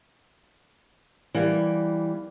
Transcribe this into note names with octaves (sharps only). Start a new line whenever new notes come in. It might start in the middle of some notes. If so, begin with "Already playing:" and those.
E3 G3 A#3